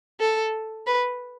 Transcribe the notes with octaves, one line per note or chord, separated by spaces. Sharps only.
A4
B4